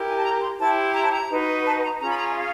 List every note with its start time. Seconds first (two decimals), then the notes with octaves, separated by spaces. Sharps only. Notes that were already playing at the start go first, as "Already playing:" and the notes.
Already playing: E4 G4 A#4
0.08 G#5
0.16 A5
0.24 A#5
0.42 C6
0.59 E4 G4 C5 A5
0.94 A#5
1.04 A5
1.13 A#5
1.31 D#4 F#4 B4
1.66 A5
1.84 A#5
2.00 C#4 F4 G#4 A#5
2.10 B5
2.18 A#5
2.31 E5
2.36 F5